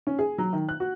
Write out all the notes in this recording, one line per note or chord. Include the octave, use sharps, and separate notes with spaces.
C#4
G#4
F#3
D#3
F#6
F#4